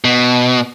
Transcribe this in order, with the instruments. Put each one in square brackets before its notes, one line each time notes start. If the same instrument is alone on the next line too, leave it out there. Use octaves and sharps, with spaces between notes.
[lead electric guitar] B2